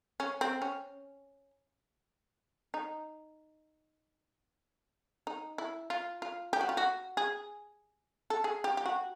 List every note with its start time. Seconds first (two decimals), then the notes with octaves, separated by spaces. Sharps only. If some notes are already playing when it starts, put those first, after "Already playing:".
0.20 C#4
0.41 C4
0.62 C#4
2.74 D#4
5.27 D#4
5.58 E4
5.90 F4
6.22 F4
6.53 G4
6.61 F#4
6.69 F4
6.77 F#4
7.17 G#4
8.30 A4
8.44 G#4
8.64 G4
8.77 G4
8.86 F#4